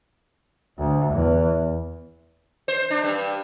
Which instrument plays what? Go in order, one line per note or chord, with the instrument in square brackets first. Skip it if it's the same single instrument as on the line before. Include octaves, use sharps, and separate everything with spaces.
[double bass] D2
E2
[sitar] C5
D4
G2